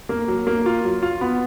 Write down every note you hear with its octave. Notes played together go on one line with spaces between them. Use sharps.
A#3
F#3
A#3
F4
F#3
F4
B3